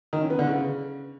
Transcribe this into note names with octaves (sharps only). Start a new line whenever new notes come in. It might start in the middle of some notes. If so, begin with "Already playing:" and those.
D#3
C#4
B3
D3
C#3